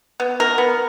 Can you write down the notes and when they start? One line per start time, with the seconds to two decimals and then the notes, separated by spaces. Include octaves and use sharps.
0.20 B3
0.40 A#4
0.58 B3